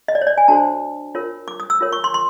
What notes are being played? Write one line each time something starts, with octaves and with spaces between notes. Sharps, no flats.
D#5
D5
C#5
D5
G#5
D4 F#4 A4 C5 A5
F4 A#4 C#5
D6
D#6
E6
F4 A#4 C#5
C#6
C6
C6